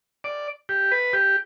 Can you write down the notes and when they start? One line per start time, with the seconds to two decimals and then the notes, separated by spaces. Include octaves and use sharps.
0.24 D5
0.69 G4
0.92 B4
1.13 G4